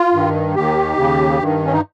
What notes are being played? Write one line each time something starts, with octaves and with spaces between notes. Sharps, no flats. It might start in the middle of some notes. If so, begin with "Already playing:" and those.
Already playing: F4
G2 D#3
D#2 D#3 G4
D#2 C#3
G2 D#3
C#4
D#4